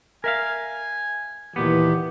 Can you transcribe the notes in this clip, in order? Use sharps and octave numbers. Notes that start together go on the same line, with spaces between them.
A#4 E5 F5 G#5
D#2 A#2 E3 B3 G4